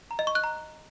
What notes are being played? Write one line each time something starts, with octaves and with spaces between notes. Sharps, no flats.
A#5
D#5
C#6
F#6
A#5